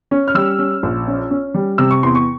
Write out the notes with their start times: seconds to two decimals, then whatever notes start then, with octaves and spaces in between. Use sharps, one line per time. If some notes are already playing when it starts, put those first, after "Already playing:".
0.11 C#4
0.28 F6
0.35 G3 E6
0.59 C#4
0.83 A#1
1.07 C#4
1.31 C#4
1.54 G3
1.78 C3 E6
1.91 C#6
2.03 E2 C6
2.15 C#6